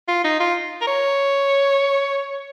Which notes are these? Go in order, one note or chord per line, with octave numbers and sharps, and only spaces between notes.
F4
D#4
F4
A#4
C#5